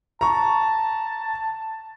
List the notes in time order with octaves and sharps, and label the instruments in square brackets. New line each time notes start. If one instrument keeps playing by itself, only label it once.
[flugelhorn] A5 [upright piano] A#5 C#6